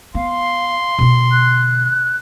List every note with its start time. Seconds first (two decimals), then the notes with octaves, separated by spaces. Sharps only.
0.15 B3 F5 C6
0.99 B2 D3
1.31 F#6